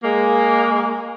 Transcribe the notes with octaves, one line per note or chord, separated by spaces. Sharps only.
G#3 A#3